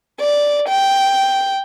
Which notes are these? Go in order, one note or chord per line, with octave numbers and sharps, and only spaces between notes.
D5
G5